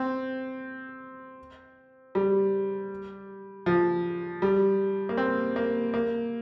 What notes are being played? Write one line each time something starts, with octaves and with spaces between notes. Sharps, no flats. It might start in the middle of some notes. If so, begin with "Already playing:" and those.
Already playing: C4
G3
F3
G3
A#3
C4
A#3
A#3